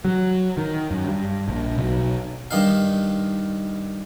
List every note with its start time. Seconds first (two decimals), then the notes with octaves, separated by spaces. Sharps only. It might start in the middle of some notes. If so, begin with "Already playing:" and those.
0.05 F#3
0.57 D#3
0.91 F#2
1.05 G2
1.48 A#1
1.78 B1
2.51 G2 D#3 D#4 F5